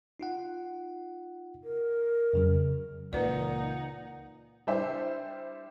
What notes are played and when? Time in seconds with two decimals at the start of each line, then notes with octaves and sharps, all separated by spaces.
0.20 D#4 F4 F#5
1.64 A#4
2.33 F2 C#3 F#3
3.13 C#2 A#2 C#3 E3 D#4 B4 D5 F#5
4.67 G3 D4 E4 C5 E5